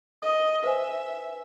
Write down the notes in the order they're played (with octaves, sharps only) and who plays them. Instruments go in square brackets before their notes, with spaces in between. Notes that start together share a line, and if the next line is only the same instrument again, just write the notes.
[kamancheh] D#5 [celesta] D#6
[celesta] B4 C5 G#5 [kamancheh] E5